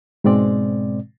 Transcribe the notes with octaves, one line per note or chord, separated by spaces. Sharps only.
G#2 B2 G#3 C4 D5